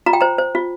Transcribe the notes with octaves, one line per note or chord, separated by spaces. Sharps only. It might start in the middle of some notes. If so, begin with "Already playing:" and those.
F4 A#5
G5
C5 A#5
C5
F4